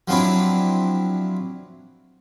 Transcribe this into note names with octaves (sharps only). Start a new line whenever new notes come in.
F3 F#3 C4 D4 E4